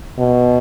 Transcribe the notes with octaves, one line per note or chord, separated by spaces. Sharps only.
B2